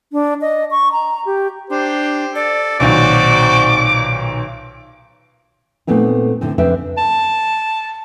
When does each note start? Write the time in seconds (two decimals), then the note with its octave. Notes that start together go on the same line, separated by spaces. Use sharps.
0.12 D4
0.41 D#5
0.71 C#6
0.92 A#5
1.26 G4
1.70 D4 G4 C5
2.35 A4 D5
2.80 B1 A#2 D#3 C4 F#4 D6
5.87 A#2 A3 B3 C4 D#4
6.41 A2 D3 A3 C4
6.58 F2 C#3 C4 D4 B4 E5
6.98 A5